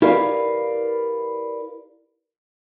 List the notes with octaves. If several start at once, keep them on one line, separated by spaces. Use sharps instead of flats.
E4 G4 A#4 B4 D5 F5